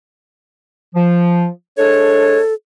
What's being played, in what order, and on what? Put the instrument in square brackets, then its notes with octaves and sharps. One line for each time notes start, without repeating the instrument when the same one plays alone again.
[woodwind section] F3
[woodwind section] G#3 D4 C#5 [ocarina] A4